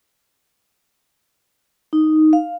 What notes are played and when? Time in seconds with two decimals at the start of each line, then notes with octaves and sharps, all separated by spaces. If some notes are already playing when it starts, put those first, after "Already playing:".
1.93 D#4
2.33 F5